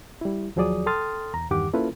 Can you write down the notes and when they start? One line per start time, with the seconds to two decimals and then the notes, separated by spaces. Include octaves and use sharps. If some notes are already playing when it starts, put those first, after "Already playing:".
0.21 G3 E4
0.56 D#2 F3 F#3 G#4 D5 D#6
0.86 A4 G5 C6 D#6 F6 A6
1.34 E2 A#5
1.51 E2 G2 D#3 G4 F#5 D6
1.73 A#3 C#4 E4 F4 A4 B4